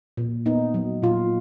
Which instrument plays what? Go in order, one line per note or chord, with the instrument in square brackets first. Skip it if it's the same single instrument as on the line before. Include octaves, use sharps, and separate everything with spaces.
[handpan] A#2
B3 D#4
F#3
A#2 F4